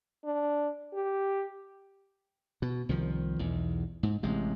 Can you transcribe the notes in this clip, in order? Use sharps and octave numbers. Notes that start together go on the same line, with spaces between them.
D4
G4
B2
C2 D#3 F3
B1 E2
G#2
A1 C3 G#3